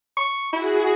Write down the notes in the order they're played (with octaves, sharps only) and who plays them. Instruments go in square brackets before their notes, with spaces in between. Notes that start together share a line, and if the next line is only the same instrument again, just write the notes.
[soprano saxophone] C#6
[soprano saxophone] E4 [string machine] F#4 G#4